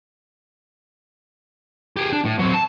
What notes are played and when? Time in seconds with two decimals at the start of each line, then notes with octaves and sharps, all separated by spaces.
1.97 G4 G#4
2.12 D4
2.25 A2
2.39 F#3 C4
2.54 A5